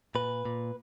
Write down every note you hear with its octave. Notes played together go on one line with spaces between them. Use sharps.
A#2 B4
A#2